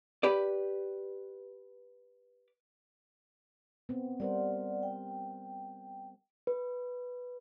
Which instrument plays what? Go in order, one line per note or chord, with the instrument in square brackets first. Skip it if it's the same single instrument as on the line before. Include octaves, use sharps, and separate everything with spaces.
[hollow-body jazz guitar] G4 B4 D5
[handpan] B3 C4
[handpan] G3 A#4 C5 [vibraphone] D5 F#5
[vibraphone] G5
[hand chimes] B4